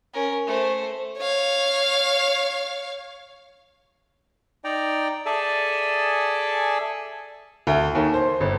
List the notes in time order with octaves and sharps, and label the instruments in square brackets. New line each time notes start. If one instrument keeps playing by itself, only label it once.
[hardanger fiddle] C#4 A#4
A3 C5
[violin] C#5 F5
[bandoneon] D#4 D5 G5 A#5
G#4 A4 D5 E5 G#5 A5
[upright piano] D2
D#2
C5
G1